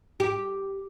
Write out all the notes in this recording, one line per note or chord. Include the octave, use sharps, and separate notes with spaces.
G4